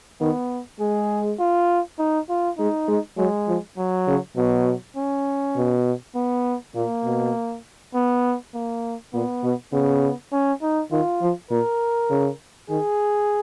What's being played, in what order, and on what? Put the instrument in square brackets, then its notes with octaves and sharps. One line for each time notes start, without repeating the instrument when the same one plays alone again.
[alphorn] D#3 [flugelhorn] B3
[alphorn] G#3 [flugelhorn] G#4
[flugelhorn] F4
D#4
F4
[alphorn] G#3 [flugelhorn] D#4
[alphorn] G#3
[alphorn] F#3 [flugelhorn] G#3
[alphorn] F3
[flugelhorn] F#3
[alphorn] C#3
[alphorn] B2 [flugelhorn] F#3
[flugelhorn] C#4
[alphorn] B2
[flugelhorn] B3
[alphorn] A#2 [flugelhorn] A#3
[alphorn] B2
[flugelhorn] B3
A#3
[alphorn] A#2 [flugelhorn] B3
[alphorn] B2
[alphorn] C#3 [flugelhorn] B3
[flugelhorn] C#4
D#4
[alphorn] D#3 [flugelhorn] F4
[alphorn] F3
[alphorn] A#2 [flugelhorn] A#4
[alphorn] C#3
[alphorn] D#3 [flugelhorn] G#4